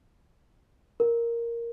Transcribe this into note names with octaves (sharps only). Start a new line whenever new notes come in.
A#4